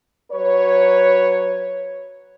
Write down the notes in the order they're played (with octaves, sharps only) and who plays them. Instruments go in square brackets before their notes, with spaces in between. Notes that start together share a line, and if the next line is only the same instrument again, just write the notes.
[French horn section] F#3 B4 C#5